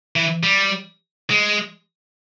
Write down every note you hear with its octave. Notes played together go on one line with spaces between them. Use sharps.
E3
G3
G#3